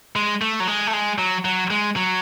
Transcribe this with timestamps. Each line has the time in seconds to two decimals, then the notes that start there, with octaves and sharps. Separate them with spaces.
0.16 G#3
0.42 A3
0.60 F#3
0.68 G#3
0.87 A3
0.93 G#3
1.18 F#3
1.45 F#3
1.71 G#3
1.96 F#3